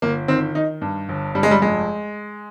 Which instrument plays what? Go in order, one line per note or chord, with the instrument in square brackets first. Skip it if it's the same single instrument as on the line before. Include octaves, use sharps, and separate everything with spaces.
[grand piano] G1 A#3
D#3 C4
D#3 D#4
G2
G1
G2 G3
G#3
G3
F1 G#3